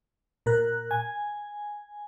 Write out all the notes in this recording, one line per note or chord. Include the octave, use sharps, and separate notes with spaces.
A#2 A#4 F#6
G#5